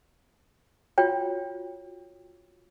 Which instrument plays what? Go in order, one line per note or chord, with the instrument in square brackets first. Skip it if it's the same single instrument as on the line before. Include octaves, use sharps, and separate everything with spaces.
[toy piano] F4 F#4 C#5 G5